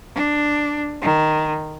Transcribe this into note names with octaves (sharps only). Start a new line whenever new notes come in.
D4
D#3